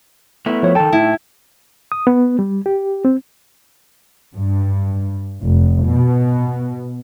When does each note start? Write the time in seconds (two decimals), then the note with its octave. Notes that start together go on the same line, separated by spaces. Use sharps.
0.46 A3 B3 E4
0.63 F3 C#5
0.75 D#3 A4 G5 A5
0.92 A2 E4
1.92 D#6
2.07 B3
2.39 G3
2.66 G4
3.05 C4
4.35 G2
5.43 F1
5.86 B2